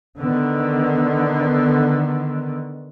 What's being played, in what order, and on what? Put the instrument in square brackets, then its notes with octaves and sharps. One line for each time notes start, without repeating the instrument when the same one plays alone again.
[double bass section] D3 D#3 B3